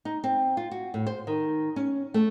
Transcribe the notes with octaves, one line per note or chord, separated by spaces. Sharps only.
D#4
C4
F4
F#4
A2
C5
D#3
C#4
A3